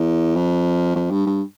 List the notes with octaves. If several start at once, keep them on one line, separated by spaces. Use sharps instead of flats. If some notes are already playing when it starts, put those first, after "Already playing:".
Already playing: E2
F2
F2
G2
G2